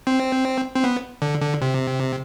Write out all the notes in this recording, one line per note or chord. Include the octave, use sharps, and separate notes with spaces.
C4
C4
B3
D3
D3
C3